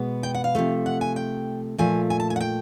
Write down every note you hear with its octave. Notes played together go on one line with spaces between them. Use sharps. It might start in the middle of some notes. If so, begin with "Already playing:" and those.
Already playing: B2 G#3 B3
G5
F#5
F5
C3 F3 A3
F#5
G#5
G5
A#2 F3 A3 G#5
G#5
A5
G#5
F#5
G5